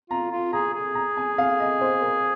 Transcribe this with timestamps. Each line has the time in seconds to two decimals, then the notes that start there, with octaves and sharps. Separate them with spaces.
0.10 F4 A#5
0.31 F4
0.53 G#4 A#5
0.74 G#4
0.95 A#5
1.17 G#5
1.38 F5
1.60 D#5
1.81 C5
2.02 A#4